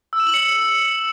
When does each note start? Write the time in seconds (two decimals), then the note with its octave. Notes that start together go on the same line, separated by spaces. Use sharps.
0.13 E6
0.20 E7
0.27 F#7
0.34 C#7